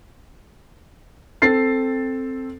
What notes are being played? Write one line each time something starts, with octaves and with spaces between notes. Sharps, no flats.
C4 A4 A6 C7